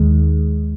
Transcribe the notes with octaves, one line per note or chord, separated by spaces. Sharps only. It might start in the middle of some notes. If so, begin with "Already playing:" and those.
Already playing: D#2 D#3 G#3